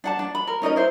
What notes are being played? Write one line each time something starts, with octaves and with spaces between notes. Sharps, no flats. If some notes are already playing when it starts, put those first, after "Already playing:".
D4 F#5 A5
D4
B5
A#4
C#4 D#4 A#4 D#5
E4 C5